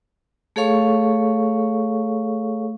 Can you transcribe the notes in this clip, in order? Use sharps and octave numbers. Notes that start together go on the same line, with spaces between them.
A3 G#4 A4 C#5 F5 C#6